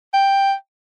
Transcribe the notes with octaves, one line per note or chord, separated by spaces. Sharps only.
G5